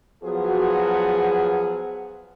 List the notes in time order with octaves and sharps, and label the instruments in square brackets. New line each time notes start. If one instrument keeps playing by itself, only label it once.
[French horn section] F3 F#3 B3 F#4 G#4